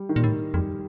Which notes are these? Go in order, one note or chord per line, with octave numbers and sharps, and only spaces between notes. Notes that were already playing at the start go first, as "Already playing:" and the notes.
Already playing: G3
D#3
A#2
A2
F2 G3